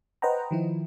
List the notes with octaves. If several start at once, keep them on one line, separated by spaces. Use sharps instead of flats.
B4 C5 D#5 F#5 G5 A#5
D#3 F3 E4